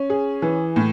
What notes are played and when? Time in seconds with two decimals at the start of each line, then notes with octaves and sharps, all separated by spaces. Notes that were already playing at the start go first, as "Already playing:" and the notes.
Already playing: C#4
0.10 G#4
0.42 E3
0.76 A2